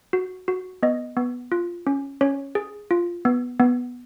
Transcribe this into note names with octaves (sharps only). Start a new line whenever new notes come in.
F#4
F#4
B3 D#5
B3
F4
C#4
C#4 C#5
G#4
F4
B3
B3